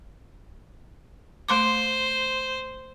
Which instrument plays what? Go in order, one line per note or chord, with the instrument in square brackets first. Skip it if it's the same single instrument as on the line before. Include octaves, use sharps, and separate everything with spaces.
[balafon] A3 C6 D6 [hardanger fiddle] C5